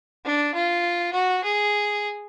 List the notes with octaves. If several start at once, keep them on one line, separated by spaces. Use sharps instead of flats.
D4
F4
F#4
G#4